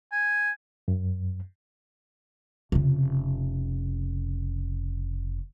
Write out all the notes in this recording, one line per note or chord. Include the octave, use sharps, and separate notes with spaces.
G#5
F#2
F1 C#3